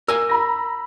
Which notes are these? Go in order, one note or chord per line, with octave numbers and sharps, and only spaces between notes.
A#4 D5 G#5 E6
A#5 B5 A#6